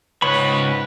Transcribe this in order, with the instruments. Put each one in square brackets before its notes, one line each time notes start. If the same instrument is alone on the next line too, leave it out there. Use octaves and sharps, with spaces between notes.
[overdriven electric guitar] C#2 C#5 [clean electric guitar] G#2 B5 [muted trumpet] B4